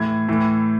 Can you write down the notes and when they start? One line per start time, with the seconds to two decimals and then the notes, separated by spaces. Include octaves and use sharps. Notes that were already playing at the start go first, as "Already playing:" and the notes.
Already playing: A2 E3 G#6
0.29 A2 E3